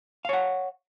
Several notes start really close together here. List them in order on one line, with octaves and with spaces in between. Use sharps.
F5 C#5 F#5